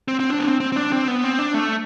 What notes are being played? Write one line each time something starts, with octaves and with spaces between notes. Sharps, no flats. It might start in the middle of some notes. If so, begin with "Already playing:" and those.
C4
C4
D4
B3
C4
C4
C4
D4
C4
B3
C4
D4
A3